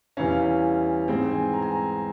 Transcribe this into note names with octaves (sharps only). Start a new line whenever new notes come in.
E2 E3 G3 C#4 F5
G#2 E3 G#3 C4 G5
G#5
A#5
G#5
A#5